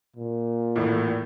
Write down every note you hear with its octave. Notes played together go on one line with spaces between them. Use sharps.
A#2
E2 A2